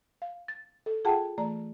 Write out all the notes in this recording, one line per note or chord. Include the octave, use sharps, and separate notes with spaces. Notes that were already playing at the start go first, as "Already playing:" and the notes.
F5
A6
A4
F4 G#4 F#5 G5 A5
E3 A3 D5 A#5